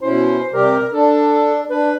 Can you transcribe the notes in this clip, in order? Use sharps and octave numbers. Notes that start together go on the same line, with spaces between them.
B2 C#4 E4 C5
C3 G3 G4 A#4
D4 A4
D4 B4